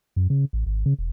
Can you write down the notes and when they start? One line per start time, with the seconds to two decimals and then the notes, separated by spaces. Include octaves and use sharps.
0.16 F#2
0.30 C#3
0.53 A1
0.66 G#1
0.86 C#3
0.99 E1